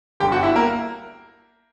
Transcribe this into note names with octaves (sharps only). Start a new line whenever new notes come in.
G1 G2 D3 G4 G5
F#4 F#5
E4 E5
A#3 A#4